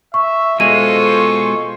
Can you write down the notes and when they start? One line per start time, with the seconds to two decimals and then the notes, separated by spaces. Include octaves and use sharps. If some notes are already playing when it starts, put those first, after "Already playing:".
0.14 E5 C#6
0.60 B2 G#3 F4 A4 C5 C#6 D#7